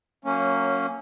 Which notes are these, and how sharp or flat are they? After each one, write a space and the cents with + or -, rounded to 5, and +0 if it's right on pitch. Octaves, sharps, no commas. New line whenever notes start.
F#3 -15 A#3 -25 C#4 +0